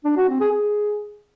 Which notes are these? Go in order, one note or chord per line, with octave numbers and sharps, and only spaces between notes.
D4
F#4
C4
G#4
G#4